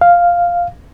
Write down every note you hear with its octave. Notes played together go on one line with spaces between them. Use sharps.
F5